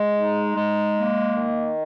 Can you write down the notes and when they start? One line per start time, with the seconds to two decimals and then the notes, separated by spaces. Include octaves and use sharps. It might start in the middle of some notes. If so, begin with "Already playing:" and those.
Already playing: G#3
0.18 D#4
0.57 G#3
0.97 A#3
1.37 D#3